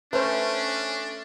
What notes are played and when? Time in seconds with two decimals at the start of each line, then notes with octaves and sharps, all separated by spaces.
0.13 A3 C#4 D4 B4 C5